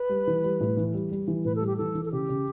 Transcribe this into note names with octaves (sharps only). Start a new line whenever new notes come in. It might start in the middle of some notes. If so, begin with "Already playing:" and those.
Already playing: B4
G3
E3
G3
A2
E3
G3
G3
E3
A2 B4
A4
G3
G4
E3 A4
E3
A4
C#3 G4
C#3